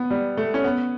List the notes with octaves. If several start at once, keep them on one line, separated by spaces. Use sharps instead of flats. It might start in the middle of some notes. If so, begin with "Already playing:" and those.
Already playing: B3
G3
A3
C#4
B3